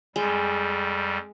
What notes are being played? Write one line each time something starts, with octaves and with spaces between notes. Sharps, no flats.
F2 G3 G#3